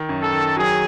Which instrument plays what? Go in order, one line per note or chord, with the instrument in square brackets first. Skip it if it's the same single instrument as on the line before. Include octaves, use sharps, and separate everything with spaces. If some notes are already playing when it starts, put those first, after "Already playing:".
Already playing: [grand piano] D#3
F#2
[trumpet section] A4
[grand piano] D#3
[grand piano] F#3 [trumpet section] G#4